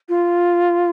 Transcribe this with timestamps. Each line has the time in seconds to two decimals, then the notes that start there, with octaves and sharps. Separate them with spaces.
0.09 F4